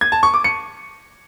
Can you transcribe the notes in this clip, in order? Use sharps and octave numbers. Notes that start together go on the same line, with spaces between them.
G#6
A5
C#6
D6
C#7